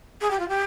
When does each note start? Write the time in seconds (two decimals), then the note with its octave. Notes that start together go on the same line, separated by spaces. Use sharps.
0.21 G#4
0.30 G4
0.39 F4
0.48 G4